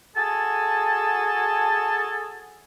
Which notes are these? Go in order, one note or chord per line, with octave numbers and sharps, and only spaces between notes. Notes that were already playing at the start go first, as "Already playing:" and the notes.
F#4 G#4 A4 G#5 A5